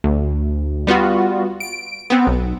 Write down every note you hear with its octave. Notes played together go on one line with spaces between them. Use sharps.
D2
G3 B3 F4 F#4
D7
B3 C4
B1